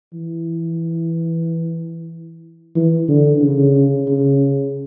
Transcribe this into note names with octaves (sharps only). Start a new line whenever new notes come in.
E3
E3
D3
C#3
C#3